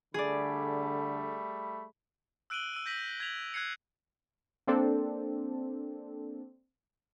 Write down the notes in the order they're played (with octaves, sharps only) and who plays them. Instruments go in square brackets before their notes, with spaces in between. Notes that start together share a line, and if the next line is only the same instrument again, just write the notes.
[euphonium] D3 [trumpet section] G3 A3 B5 [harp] G#4 D5
[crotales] E6 F#6 D7 D#7 F#7 G7
E6 D#7
G6 A#6 B6 D#7 F#7
G#6 B6 F7 F#7
F#6 G#6 C7 C#7 F7
[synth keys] A#3 C4 D4 A4